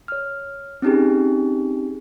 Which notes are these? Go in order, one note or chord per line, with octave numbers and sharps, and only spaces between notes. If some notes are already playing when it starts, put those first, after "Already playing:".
C#5 F6
C4 C#4 D#4 G4 G#4